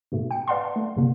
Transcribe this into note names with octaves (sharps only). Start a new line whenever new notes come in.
G#2 B2 A3
G5 C#7
B4 D5 F5 F#5 A5 C6
F#5 A5
A3
G1 C3 A#3